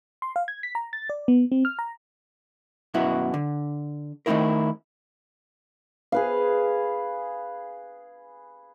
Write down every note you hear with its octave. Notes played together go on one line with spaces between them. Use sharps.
C6
F5
G#6
B6
A#5
A6
D5
B3
C4
F6
A#5
F#2 B2 B3 E4 F#4
D3
D#3 A3 C4 D#4 E4 A#4
G#4 B4 F5